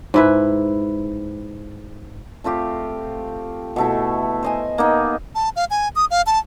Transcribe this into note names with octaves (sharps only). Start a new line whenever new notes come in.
G#2 E4 B4
A3 C4 F4 G4
B2 A3 E4
C5 D#5 G#5
A#3 B3 D#4
A5
F5
G#5
D#6
F5
A5